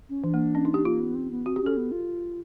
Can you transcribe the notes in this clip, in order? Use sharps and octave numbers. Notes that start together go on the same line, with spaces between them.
C#4
E3 D4
A#3
C#4
D#4
G4
A#3 F4
B3
C4
B3
C4 F#4
G4
C#4 A4
B3
F4